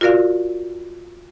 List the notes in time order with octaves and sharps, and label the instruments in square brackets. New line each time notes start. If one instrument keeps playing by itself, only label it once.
[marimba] F4 F#4 A#4 D5 F5